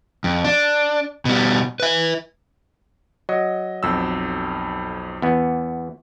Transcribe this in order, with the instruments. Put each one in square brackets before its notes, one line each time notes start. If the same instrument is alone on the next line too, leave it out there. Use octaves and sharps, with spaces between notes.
[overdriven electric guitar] F2
D4
B2 G3
B4 E5
[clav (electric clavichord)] F#3 [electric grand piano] D#5
[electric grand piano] B1 F2 E6
[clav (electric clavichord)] E2 B3